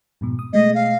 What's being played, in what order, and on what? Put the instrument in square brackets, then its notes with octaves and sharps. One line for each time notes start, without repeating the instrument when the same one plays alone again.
[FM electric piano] F2 G#2 B2
D#6
[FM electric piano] B2 G#3 A3 [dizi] D#5
[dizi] F5